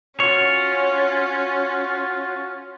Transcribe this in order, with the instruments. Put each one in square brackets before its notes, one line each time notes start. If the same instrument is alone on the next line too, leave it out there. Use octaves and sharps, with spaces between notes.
[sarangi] C#4 [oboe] F4 [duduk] F#4 [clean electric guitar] C#5